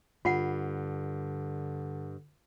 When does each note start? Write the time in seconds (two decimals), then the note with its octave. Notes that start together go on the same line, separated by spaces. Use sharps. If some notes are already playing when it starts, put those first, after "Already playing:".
0.25 G2 D3 F4 F#5